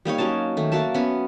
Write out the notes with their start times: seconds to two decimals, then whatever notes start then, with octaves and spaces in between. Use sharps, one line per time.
0.05 G3 A#3 D#4 C#5
0.18 F#3 A#3 C#4 A5
0.57 D#3 A3
0.72 A#3 F#4 E5 A5
0.94 B3 C#4